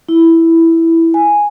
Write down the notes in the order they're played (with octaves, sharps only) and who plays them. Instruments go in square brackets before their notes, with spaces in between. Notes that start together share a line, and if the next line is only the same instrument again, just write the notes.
[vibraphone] E4
G#5